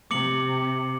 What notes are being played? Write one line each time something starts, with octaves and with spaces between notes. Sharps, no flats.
C3 D6 C#7 F#7